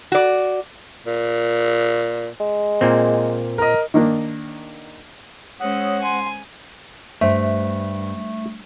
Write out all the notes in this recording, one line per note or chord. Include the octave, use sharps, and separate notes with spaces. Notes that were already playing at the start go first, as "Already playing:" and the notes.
F#4 D5
A#2
G#3
A#2 A#3 C4
A#4 D#5
D#3 A#3 D4
G#3 C#4 C5 C#5 F#5 D#6 E6
G#5 C6
G2 A3 C5 E5